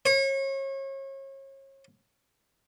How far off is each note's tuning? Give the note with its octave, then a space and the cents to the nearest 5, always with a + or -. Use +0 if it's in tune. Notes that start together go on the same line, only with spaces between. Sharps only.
C#5 -35